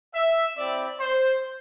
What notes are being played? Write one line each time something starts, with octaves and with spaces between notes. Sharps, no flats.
E5
C4 E4 G4 D5
C5